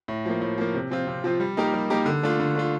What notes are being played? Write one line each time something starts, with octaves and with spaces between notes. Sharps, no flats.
A2
F3 A#3
A2
F3 A#3
C3
F3 C4 F4
C3
F3 C4 F4
G3
A#3 D#4 G4 A#4
G3
A#3 D#4 G4 A#4
D3
A3 D4 F4
D3
A3 D4 F4